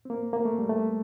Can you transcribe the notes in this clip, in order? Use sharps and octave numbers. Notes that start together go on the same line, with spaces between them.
C4
A#3
A#3
A3
G3
A3